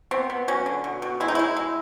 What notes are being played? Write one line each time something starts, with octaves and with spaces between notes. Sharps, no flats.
B3 C4
B3
F#3 C#4
D3
B2
B2
G#3 E4
D#4
G#3 E4
G#3